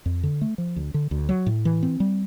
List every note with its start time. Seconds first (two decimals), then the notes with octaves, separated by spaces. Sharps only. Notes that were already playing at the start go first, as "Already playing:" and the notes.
0.06 F2
0.23 D3
0.41 A3
0.58 F3
0.76 D2
0.94 D3
1.11 D2
1.29 F#3
1.46 A2
1.65 E3
1.83 C4
2.00 G3